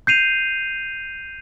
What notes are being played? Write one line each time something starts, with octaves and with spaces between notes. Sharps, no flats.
G6 C7 D#7 F7